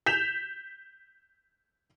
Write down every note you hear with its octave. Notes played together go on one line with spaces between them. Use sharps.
G6 B6 E7 F7